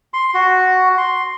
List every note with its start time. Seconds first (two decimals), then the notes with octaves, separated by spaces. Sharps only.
0.14 C6
0.34 F#4
0.98 C6